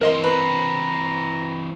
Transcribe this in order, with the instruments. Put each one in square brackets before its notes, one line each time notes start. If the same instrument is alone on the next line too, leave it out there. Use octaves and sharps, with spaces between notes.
[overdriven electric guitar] E3 C4 [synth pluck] A#4 D#5 C6
[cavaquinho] B4 [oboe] A#5